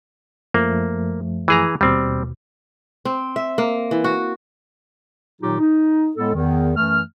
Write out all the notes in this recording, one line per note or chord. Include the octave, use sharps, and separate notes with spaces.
F#2 F3 A3 A#3
E3 G#4 A#5
D#2 B2 G3 C4
C4
E5
A#3
E3
F#4
A#2 D#3 F#3 D#4 F4 G4
D#4
A2 G#3 B3 A4
E2 D#3
F#2 E3 A3 F6